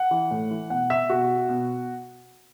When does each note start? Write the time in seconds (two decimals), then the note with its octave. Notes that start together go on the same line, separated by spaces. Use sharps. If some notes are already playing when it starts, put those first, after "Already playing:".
Already playing: F#5
0.11 E3
0.31 A2
0.51 E3
0.70 B2 F#5
0.90 E5
1.09 B2 F#4
1.49 B2